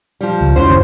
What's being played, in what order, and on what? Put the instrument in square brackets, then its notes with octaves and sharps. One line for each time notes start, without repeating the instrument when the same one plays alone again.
[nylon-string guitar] F3 G3
[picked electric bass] C#2
[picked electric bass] E1 [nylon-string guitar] C#4 E4 F#4 [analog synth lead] C5
[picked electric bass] F#1 D#2